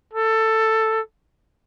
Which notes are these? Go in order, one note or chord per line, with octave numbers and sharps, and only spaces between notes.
A4